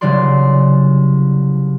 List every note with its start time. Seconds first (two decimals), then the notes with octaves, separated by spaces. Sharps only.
0.01 C2 C#3 E3 F#3 D5 C6